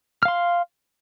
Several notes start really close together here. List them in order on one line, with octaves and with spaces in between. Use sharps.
F6 F5 C6